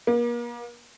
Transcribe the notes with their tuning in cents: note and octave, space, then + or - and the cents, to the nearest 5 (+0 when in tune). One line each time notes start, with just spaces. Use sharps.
A#3 +40